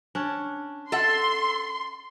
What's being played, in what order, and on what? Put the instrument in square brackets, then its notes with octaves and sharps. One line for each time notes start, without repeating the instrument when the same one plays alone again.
[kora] C#4 D4
[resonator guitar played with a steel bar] A4 E5 F#5 [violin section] C6